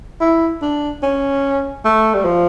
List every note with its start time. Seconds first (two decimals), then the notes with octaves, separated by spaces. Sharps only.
0.20 E4
0.61 D4
1.03 C#4
1.85 A3
2.14 G3
2.25 F3